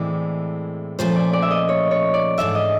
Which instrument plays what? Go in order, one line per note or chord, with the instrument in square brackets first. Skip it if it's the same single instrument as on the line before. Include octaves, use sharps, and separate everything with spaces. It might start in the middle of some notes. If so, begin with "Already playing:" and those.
Already playing: [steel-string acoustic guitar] A2 E3 G#3 C4 E4 [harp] D5
[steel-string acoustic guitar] A#2 F3 A3 C#4 [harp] C5
[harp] D5
D5
E5
D#5
C#5
C#5
D5
[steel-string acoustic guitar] G#2 E3 A3 D4 [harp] E5
[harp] D#5